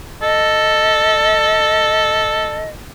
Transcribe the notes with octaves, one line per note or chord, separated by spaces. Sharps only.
A4 D#5